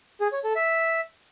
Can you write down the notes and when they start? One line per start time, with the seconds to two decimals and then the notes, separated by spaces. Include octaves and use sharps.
0.21 G#4
0.32 C#5
0.44 A4
0.56 E5